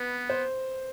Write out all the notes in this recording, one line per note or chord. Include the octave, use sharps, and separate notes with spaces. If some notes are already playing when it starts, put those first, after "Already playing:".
Already playing: B3 B4
C5